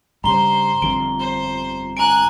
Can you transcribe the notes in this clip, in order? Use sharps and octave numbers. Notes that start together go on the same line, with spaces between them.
G2 C#3 G3 C5 A#5 C6 G7
G1 F2 D7 G7
C5
G#5 A#5 F#6 D7